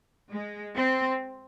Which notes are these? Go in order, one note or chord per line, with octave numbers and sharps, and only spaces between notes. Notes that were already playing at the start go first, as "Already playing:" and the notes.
G#3
C4